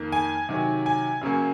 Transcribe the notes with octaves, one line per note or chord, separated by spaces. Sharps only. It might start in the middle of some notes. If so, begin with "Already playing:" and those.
Already playing: F2 D#3 A#3
G#5
C3 D#3 F#3
G#5
F#2 C#3 F#3 A#3